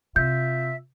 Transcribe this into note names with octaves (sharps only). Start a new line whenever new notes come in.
C3 F4 E5 G6